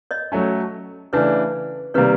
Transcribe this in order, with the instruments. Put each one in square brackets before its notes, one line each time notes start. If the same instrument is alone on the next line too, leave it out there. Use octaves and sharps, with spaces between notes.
[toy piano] C#5 D#5
[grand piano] F#3 A3 C#4
[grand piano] C#3 E3 A3 D4 [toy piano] B4 C#5
[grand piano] C3 D#3 G3 A#3 [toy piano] B4 C#5